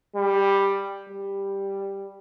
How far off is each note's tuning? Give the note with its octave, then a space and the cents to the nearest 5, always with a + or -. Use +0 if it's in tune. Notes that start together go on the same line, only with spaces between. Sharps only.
G3 +10
G3 +5